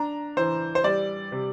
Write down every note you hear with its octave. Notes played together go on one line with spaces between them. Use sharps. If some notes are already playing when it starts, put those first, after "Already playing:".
Already playing: D4 A#5
E3 C5
C5
G3 D5
C3